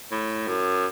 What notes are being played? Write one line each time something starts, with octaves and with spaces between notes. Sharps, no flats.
A2
F#2